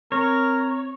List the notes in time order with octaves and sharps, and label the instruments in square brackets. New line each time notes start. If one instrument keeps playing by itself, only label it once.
[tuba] C4 [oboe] A#4 [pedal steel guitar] C#5